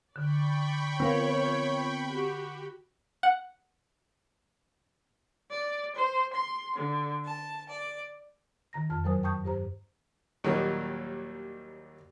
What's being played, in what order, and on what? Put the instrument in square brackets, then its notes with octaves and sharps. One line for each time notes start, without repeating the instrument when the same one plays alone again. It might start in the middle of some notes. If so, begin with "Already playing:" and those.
[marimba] D3 [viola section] D5 [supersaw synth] G5 B5 C#6
[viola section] F3 C#5 [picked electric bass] B3 C4 [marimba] A#4 F5
[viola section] F#4 G4
[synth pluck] F#5
[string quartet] D5
C5
C6
D3
A5
D5
[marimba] D#3 A#5 A#6
F2 A5 F6
F#2 F#3 A#4 C5 G#5 D#6
G5 A5 C#6 D#6 G6
G2 G4 C5 A#5
[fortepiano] D#2 A#2 F#3 G3 A#3 D#4